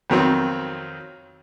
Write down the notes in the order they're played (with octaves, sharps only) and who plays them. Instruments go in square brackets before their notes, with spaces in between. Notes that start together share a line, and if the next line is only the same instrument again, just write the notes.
[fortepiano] F2 D#3 F#3 C4